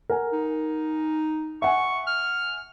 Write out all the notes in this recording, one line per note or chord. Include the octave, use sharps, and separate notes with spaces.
A#4 F#5 G#5
D#4
E5 F#5 G#5 C#6
F6